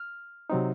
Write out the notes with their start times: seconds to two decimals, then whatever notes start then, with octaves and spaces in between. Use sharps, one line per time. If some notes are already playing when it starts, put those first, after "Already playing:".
Already playing: F6
0.50 C3 F#3 C4 D#4